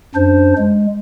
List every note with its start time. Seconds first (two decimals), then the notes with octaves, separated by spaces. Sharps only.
0.15 F#2 D4 C5
0.58 G#3